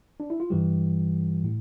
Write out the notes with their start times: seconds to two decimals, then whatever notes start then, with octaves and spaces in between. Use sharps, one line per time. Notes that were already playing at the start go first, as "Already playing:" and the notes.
0.20 D4
0.30 E4
0.40 F4
0.50 G2 E3 G3 G4
1.44 A2